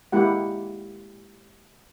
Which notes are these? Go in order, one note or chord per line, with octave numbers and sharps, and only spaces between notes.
G#3 A#3 E4 G4 F#5